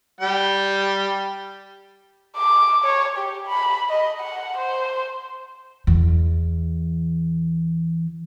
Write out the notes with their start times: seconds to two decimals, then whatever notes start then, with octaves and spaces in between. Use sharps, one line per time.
0.21 G3 G5
2.37 D6
2.85 C#5
3.18 G4
3.47 B5
3.89 D#5
4.20 F#5
4.58 C5
5.87 E2 E3